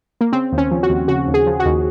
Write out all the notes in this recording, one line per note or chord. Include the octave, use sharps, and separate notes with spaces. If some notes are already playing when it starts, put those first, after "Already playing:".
A#3
C#3 C4
D#2
C#4
F3
F#4
D#2
C#3 F#4
D#2
G#4
F3
F#4
D#2